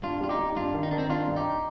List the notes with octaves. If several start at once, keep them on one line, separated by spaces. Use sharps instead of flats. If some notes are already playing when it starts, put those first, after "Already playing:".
G2 D4 F4
G3 F4
D#4 G4
G3
G2 D4 F4
D#3
D#4
D#3 D4
C4 D#4
D#3 D4 F4
G2
D#4 G4